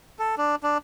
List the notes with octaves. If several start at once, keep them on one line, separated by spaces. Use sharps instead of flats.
A4
D4
D4